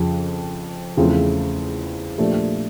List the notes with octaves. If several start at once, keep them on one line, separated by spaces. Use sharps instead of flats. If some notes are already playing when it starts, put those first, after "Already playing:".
Already playing: F2 C#3 F3
E2 C#3 F3 A3 C4
A#2 F3 A3 D4 G4